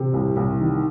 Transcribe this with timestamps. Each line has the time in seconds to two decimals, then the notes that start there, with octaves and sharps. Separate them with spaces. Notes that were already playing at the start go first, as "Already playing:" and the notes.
Already playing: C3
0.13 C2
0.36 C2
0.60 D#3